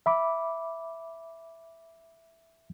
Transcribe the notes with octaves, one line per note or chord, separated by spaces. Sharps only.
E5 B5 D6